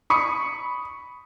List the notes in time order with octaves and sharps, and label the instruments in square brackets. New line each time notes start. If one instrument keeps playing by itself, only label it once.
[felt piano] B5 C#6 D#6 C#7